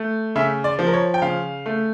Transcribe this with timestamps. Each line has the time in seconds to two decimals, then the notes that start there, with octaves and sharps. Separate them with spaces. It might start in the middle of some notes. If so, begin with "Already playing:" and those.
Already playing: A3
0.36 C#3 E5
0.64 D5
0.79 F3
0.87 A#4
0.93 C#5
1.14 G5
1.22 C#3 F5
1.66 A3